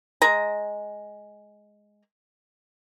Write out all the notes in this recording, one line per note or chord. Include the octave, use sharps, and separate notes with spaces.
G#3 A#5